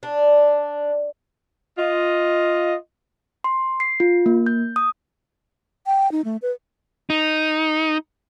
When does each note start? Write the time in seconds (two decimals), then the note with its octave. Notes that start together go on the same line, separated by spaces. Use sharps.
0.03 D4
1.78 F4 D#5
3.44 C6
3.80 C7
4.00 F4
4.26 A#3
4.46 G6
4.76 D#6
5.86 G5
6.12 D#4
6.25 A3
6.42 B4
7.10 D#4